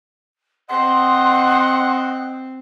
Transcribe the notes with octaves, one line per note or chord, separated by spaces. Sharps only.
C4 D#5 F#5 C6